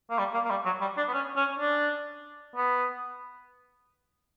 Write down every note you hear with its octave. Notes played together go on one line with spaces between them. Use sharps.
A#3
G3
A#3
A#3
G3
F#3
G3
D4
B3
C#4
C#4
D4
B3